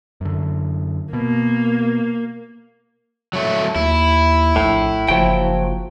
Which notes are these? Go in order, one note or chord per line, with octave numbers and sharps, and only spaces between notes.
F#2 D3
B2 A#3
F#3 A3
D#2 E4
A#1 A2
F#1 F3 F#3 G5